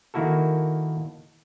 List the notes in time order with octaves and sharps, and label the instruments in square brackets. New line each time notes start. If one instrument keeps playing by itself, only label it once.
[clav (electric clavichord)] D#3 A#3 E4 F#4 A4